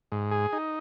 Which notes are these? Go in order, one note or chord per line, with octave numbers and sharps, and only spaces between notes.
G#2
G#4
D#4